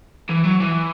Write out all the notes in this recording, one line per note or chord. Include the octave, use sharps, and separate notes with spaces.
E3
F#3
E3